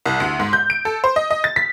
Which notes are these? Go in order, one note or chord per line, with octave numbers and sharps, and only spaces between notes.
C2
D2
G#2
G6
D7
A4
C5
D#5
D#5
A6
B6